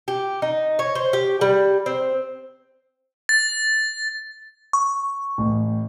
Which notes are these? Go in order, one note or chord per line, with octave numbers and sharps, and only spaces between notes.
G4
D#4
C#5
C5
G4
G3
C4
A6
C#6
A1 A2